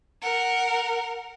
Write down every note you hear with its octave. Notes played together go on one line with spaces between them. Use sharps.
A#4 F#5